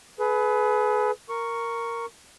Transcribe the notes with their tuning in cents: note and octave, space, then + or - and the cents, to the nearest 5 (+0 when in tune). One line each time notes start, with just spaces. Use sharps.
G#4 +35 B4 +10
A#4 -5 C#6 +0